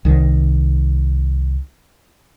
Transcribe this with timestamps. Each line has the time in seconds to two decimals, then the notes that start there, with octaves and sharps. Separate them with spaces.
0.05 C2 D#3